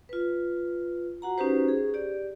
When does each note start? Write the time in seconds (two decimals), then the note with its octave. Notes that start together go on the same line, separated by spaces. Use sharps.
0.09 F4 B4
1.22 F#4 F#5 A#5
1.38 C#4 D#4 F#4 G4 B4 C5
1.68 G#4
1.94 G4 D5